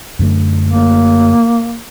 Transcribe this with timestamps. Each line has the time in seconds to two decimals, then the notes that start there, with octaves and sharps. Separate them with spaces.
0.19 F#2 D3 A3
0.70 A#3